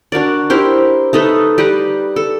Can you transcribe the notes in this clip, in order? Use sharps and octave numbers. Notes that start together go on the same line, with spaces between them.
D4 F#4 A#4 D5
E4 G4 A#4 C5
A3 D#4 A4 B4
G3 G4 B4 A#5
A4